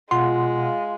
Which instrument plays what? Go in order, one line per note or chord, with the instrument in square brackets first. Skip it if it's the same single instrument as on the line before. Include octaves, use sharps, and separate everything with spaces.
[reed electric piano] B2 F#5 [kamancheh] G#3 [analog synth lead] F4 [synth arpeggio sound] C6